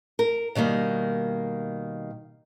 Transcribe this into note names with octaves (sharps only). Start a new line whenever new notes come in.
A#4
B2 D#3 G3 A#3